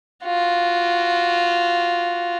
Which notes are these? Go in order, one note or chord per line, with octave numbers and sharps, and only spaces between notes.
F4 F#4